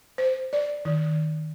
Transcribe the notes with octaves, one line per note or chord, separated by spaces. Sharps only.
C5
D5
D#3